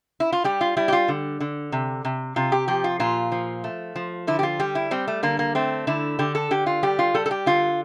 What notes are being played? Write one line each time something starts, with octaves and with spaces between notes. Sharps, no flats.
E4
F4
G3 G4
F4
G3 E4
G4
F4
D3
D3
C3
C3
C3 F4
G4
F3 G4
F4
A#2 F4
F3
A3
F3
D3 E4
G4
F4
G3 G4
E4
G3 C4
A3
D3 A#3
A#3
A3 C4
D3 E4
D3 G4
A4
D3 G4
F4
G3 G4
F4
G3 A4
A4
G4
D3 F4